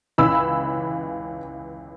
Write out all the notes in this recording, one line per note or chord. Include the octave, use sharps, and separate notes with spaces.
C#2 C#3 E3 B5 E6